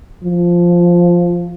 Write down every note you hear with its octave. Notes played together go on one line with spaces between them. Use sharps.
F3